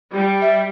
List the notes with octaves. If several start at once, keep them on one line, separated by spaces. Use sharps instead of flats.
G3
E5